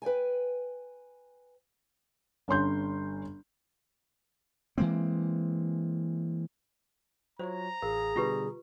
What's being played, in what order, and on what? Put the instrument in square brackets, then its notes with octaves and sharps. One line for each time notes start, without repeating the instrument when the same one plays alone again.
[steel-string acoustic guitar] B4 D5 G5 G#5
[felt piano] G1 C#4 C6 G6
[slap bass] E3 G#3 A#3 C4
[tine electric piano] F#3 F4 C#5 [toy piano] C5 [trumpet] A#5
[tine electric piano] A1 F5 [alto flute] G#4 [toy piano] A#4
[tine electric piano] B2 D3 G3 [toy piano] F4 G4 B4